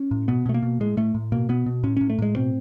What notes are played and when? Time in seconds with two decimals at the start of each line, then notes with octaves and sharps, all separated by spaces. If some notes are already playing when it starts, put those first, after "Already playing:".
Already playing: C#4
0.11 A2
0.28 B2 B3
0.46 B2 A3
0.54 A#3
0.63 B2
0.80 A2 G#3
0.97 A2 A3
1.14 A2
1.32 B2 A#3
1.49 B2 B3
1.66 B2
1.83 A2 C#4
1.97 A2 C#4
2.10 A3
2.19 A2 G#3
2.36 B2 C4